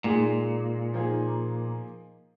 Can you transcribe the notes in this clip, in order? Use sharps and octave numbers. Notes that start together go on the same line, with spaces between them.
A#2 G#3 D#4 G#4
F3 A#3 D#4 G#4